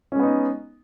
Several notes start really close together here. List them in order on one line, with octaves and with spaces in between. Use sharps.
C#4 G#3 B3 D#4